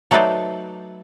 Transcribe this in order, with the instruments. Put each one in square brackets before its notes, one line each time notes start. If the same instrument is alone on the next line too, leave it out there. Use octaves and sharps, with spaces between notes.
[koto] F#3 A3 D#4 B4 C5 D5